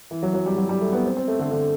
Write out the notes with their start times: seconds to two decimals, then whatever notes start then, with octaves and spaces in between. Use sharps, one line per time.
0.11 E3
0.23 F#3
0.34 F#3
0.46 G3
0.57 F#3
0.69 G3
0.81 A3
0.93 B3
1.04 C4
1.17 C4
1.28 A3
1.39 D3
1.51 D3